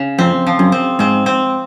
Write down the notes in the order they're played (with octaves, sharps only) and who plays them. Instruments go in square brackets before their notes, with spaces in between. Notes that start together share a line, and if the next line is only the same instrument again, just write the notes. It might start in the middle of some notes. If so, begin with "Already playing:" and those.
Already playing: [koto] C#3
[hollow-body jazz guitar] F2 [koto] C4
[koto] F3
[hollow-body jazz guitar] F#2
[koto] C4
[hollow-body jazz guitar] G#2 [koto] C4
[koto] C4